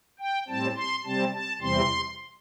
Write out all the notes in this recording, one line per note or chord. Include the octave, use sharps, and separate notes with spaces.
G5
A2 G3 C4 A5
C6
C3 G3 C4 A5
A5
E2 C3 E3 G3 C4 C6